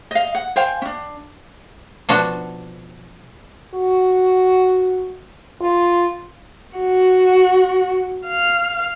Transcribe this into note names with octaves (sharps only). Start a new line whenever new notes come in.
D#5 F5
F#5
C5 F5 G5 G#5
C#4 D4
B2 F3 D4 F#4
F#4
F4
F#4
F5